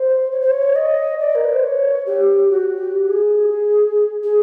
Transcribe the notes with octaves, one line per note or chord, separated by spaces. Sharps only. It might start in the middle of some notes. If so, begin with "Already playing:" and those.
Already playing: C5
C#5
C5
C#5
D#5
D5
A#4
B4
C5
C#5
G4
F#4
G4
G#4
G#4